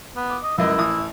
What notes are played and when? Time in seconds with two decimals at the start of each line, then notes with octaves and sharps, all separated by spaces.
0.16 B3
0.30 D6
0.43 D#5
0.58 C#2 F#2 E4 D#5
0.78 A1 D#6